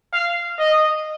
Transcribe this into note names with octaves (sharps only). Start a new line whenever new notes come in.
F5
D#5